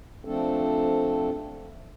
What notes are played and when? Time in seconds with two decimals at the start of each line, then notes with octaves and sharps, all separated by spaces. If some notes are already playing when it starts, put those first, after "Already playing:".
0.25 F3 A3 C4 D4 A4